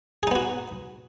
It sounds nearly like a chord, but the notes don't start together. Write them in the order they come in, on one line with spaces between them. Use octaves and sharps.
G#4 D#4 B3 F#4